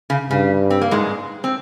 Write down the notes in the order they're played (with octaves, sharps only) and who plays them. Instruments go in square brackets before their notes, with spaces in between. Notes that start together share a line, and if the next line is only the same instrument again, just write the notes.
[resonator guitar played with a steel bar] C#3
[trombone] G2 [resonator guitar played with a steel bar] C#3
[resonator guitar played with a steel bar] C4
A#3
G#2 G#3
C4